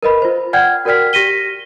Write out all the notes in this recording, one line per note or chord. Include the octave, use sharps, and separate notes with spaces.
A#4 B4 D#5 B5
F4 C5
D5 F#5 G5 F6 G6 G#6
F#4 A#4 D5 G5 F6 B6
G4 A#6 B6 D#7 G7